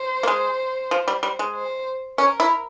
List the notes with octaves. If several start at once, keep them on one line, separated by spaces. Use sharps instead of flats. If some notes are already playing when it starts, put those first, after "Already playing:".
Already playing: C5
A#3
G#3
F3
G3
G3
G#3
C5
C#4 A#4
E4